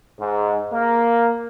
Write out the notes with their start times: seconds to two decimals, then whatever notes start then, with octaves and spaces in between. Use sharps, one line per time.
0.19 G#2
0.72 A#3